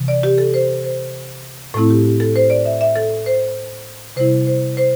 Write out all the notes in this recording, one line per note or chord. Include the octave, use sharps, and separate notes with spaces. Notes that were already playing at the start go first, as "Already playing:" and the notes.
Already playing: C3 E3
D5
G4
A4
C5
C5
A2 A3 C4 E4 A4
G4
G4
A4
C5
D5
E5
E5
A4
C5
C3 G3 E4 C5
C5
C5